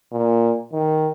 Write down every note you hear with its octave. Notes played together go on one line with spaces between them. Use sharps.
A#2
D#3